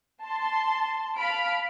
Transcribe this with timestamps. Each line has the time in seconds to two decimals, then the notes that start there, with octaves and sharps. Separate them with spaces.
0.23 A5 C6
1.17 F5 A5 B5 F6 D7